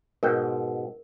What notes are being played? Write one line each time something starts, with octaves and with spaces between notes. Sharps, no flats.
G#2 B2 A#4 G5